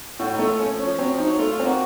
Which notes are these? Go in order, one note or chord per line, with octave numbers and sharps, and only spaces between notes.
A2 F#4
D#4
A3
F4
A3 C#4
F3
C#4
F3
F#3 C4
F3
D#4
F#3
A3 F4
F4
C4
A#3 D#4 F#4